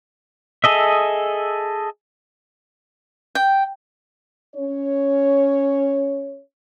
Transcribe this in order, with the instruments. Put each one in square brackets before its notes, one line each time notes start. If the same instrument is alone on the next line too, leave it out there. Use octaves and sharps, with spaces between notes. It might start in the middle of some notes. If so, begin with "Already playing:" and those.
[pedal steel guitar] G#4 A4 D#5 E5
[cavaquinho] G5
[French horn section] C#4 C#5